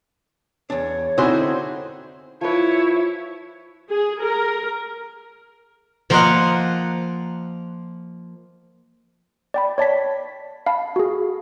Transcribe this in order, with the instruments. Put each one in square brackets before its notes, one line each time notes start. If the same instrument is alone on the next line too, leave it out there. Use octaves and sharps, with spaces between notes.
[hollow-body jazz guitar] E2 D4 [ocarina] C#5
[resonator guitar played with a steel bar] D3 F#4 C5 [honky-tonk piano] C4 D#4 [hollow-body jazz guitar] E4 G#4 G5
[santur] F3 B4 [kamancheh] E4 C#5
[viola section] G#4
A#4
[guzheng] F3 A#3 F4 A#4 D#5 F#5
[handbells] D5 G5 B5
C#5 D5 A5 B6
F5 A5 B5
F#4 G#4